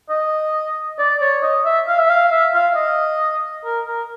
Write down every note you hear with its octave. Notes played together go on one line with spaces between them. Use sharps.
D#5
D5
C#5
D#5
E5
F5
E5
F5
E5
F5
D#5
A#4
A#4